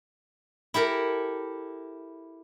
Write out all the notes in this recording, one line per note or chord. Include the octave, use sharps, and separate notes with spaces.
E4 G4 A4 A#4